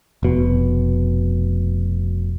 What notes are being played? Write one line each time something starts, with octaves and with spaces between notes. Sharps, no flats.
F1 B2